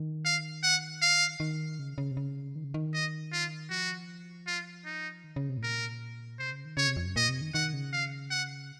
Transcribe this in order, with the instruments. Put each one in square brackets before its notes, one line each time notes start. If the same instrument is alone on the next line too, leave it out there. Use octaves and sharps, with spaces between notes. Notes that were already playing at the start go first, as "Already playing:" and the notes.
Already playing: [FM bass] D#3
[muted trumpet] F5
F#5
F5
[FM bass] D#3
C#3
C#3
C3
C#3
D#3
C#3
D#3
[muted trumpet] D#5
F4
[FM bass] F3 [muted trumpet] F#4
[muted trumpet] F4
D#4
[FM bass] D#3
C#3
C3
A2
[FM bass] A#2 [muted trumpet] A#4
[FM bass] C3 [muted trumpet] C5
[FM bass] C#3
D#3
[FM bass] C#3 [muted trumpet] C#5
[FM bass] C3
F2
F#2
[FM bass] A#2 [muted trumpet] D#5
[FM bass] C3
D#3
[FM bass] D#3 [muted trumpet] F#5
[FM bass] C#3
[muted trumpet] F5
F#5